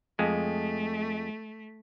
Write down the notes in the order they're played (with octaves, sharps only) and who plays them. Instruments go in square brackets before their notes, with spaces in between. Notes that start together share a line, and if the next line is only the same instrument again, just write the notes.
[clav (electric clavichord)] F2 G#3 [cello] A3